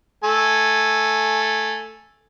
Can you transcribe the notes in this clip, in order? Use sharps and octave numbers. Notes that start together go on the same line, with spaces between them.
A3 G#5